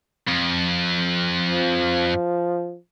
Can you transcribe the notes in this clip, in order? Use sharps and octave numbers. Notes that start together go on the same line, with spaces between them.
F2
F3